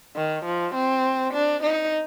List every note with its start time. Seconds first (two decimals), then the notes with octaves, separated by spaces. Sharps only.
0.16 D#3
0.45 F3
0.74 C4
1.34 D4
1.63 D#4